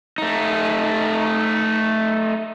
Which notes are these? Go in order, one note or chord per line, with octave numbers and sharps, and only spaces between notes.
A3 D#4